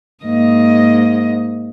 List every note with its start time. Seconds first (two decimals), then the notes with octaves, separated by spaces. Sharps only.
0.25 G#2 A#3 D#5